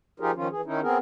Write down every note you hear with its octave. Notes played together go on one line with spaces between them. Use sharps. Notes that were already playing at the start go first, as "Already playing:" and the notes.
F3 D#4 F4 G4 G#4 A#4
D#3 F3 C#4 F4
E3 G#4
D#3 C#4 D#4 E4
B3 C4 G#4 A#4